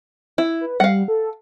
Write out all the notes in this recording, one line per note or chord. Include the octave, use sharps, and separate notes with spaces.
E4
B4
G3 F5 F#5
A4